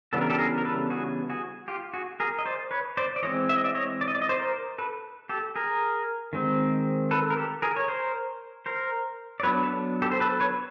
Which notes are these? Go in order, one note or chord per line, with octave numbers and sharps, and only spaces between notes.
C#3 E3 G3 B3 D4 A4
A#4
G4 A4
G#4 A#4
A#4
A4 B4
F#4 G#4
F#4 G#4
F4 G4
F#4 G#4
G#4 A#4
D#5
C5 D5
B4 C#5
C5 D5
D5
E3 G#3 C4 C#5 D#5
E5
D#5
D5 E5
C#5 D#5
D5
D#5
D5
D#5
C5 D5
A#4 C5
A4 B4
G4 A4
G#4 A#4
D#3 G#3 C4
A4 B4
A#4
G4 A4
G#4 A#4
C#5
A#4 C5
A#4 C5
D5
F#3 B3 D4 B4 C#5
A4 B4
G4 A4
C5
A4 B4
B4 C#5